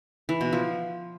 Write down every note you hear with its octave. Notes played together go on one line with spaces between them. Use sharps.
E3
B2
F3